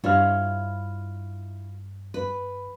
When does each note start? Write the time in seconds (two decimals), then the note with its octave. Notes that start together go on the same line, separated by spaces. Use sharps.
0.04 G2 E4 F4 C#5 F6
2.14 B4